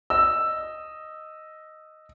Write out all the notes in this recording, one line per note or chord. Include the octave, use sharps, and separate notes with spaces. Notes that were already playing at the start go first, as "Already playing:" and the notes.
D#5 E6